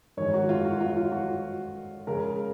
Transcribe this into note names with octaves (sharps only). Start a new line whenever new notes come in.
G#2 D#3 G#3 C#5
F#4
F4
F#4
F4
F4
F#4
C#3 G#3 C#4 A#4